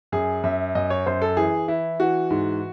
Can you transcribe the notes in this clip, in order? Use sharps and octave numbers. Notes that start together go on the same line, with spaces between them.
F#2 G#4
F#2 E5
F#2 D#5
C#5
F#2 C5
A4
E3 G#4
E3 E4
E3 F#4
G#2